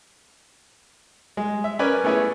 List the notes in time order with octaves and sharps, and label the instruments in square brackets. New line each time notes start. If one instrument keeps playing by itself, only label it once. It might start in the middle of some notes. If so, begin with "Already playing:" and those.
[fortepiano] G#3
E5
C#4 A#4 B4 D5 G#5
A3 B3 C#4 E4 G#4